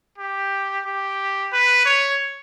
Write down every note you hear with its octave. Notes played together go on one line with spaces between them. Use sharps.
G4
G4
B4
C#5